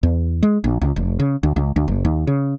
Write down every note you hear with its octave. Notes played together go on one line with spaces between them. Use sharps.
E2
G#3
A#1
C#2
F1
C#3
D2
C#2
D2
F#1
D#2
C#3